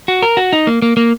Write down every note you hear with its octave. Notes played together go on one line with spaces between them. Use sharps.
F#4
A#4
F#4
D#4
A#3
A#3
A#3